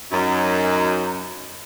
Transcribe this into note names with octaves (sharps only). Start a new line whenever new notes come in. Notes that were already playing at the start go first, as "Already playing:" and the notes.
F#2 D#4